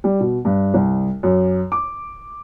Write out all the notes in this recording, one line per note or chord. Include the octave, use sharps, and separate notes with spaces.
G3
B2
G2
C2
F#2
D6